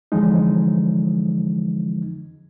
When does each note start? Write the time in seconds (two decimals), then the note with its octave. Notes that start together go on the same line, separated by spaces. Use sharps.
0.12 F2 D3 E3 F3 G#3 D#4